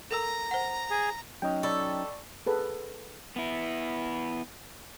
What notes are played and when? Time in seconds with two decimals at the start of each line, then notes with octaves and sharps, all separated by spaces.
0.11 A4 A#4 A#5 E6
0.51 C5 F#5
0.90 G#4
1.42 F#3 C#4 D#4 D#5 G5
1.63 A4 D5 B5 C#6
2.46 G#4 A4 B4
3.36 B3 E4